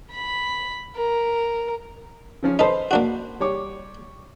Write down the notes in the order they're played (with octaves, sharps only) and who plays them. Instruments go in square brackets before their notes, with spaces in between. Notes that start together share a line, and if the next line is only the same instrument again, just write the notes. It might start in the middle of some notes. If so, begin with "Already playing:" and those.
[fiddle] B5
A#4
[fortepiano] C#3 F3 C#4
[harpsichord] D#4 A4 [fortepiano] B4 C5
[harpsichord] A#3 D4 F#4
[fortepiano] G3 C#5 D6